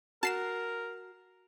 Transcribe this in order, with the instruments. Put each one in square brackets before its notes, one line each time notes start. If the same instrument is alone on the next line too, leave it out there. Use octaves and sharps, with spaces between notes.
[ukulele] F#4 [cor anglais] A#4 [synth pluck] A5 C7 E7